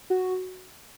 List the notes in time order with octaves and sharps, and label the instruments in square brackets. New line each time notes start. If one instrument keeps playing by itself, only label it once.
[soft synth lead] F#4